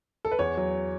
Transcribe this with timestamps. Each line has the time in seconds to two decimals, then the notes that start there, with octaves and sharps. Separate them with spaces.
0.25 A4
0.31 B4
0.39 E2 C#5
0.57 F#3